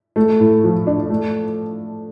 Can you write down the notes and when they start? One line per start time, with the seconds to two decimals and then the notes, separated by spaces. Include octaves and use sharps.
0.16 A3
0.40 A2
0.64 F3
0.87 D4
1.10 A3